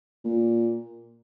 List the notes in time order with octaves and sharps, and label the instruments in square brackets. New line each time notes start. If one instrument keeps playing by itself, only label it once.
[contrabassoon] A#2